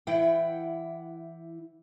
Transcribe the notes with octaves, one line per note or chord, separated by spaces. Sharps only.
E3 E4 F#5 G5